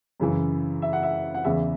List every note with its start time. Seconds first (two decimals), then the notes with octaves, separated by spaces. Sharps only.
0.20 F#2 C#3 E3
0.82 E5
0.93 F#5
1.03 E5
1.34 F#5
1.44 E2 C#3 E3 E5